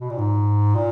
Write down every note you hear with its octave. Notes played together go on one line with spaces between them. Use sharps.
B2
A#2
G#2
A#2